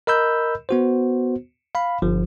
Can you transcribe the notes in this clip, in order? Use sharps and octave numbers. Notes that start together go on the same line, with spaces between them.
A#4 D#5 B5 E6 G6
B3 F#4 C5
F5 B5
G1 F3